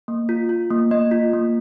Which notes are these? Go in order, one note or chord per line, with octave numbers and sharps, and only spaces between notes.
A#3
F4
F4
A#3
A#3 D#5
F4
A#3